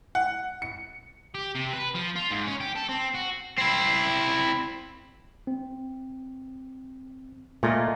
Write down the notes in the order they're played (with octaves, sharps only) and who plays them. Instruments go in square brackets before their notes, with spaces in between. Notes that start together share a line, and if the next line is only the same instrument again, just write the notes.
[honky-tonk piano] F#5
C#7
[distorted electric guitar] G4
C3
B4
F3
F4
G#2
C#4
G4
A4
C4
F#4
[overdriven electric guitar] C4 E4
[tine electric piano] C4
[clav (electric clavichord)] A#2 [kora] A3 F4 D#5